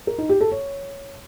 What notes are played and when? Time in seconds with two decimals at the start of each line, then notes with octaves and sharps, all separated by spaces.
0.07 A#4
0.18 D#4
0.29 G4
0.41 A4
0.52 C#5